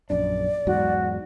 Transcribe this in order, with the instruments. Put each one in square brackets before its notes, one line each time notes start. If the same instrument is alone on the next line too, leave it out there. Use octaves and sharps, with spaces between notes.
[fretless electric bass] A#1 F#2 D4 [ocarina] D5
[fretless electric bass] E2 G#2 F#3 [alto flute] F#4